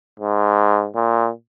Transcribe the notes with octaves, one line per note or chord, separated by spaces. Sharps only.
G#2
A#2